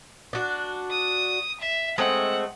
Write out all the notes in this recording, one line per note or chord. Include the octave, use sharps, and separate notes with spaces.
D4 F#4
D#6
E5
G#3 A3 C4 F#5